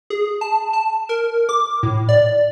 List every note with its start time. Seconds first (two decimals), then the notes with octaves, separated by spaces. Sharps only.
0.10 G#4
0.41 A5
0.73 A5
1.09 A#4
1.49 D6
1.83 A2
2.09 D5